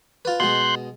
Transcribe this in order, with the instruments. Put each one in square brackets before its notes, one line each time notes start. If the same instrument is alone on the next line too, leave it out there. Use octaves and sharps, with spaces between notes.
[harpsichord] F4 B4
[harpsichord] B2 G#3 [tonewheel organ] C6 F#6 G6